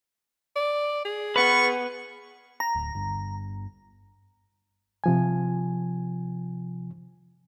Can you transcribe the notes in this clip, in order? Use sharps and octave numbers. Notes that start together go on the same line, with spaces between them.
D5
G#4
B3 F4 B4 C#6
A#5
D1
G1
C3 F3 G#5